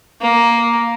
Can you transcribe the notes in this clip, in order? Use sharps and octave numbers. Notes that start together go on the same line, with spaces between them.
A#3